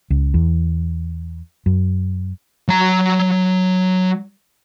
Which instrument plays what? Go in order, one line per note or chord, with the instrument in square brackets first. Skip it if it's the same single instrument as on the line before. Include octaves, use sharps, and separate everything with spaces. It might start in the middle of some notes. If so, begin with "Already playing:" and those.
[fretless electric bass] C#2
E2
F#2
[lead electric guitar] F#3 A#5